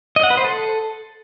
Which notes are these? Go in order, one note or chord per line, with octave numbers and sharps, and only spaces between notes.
D#5
F#5
B4
C5
A4